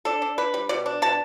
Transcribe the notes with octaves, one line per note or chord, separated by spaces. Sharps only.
D4 A4
D4
D4 B4
G3
B2 D5
D4
B2 A5